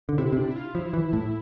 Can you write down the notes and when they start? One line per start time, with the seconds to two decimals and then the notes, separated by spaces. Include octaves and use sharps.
0.09 D3
0.18 C3 E4
0.32 C3
0.37 D4
0.50 E4
0.56 F4
0.74 F3 E4
0.93 E3
1.13 A2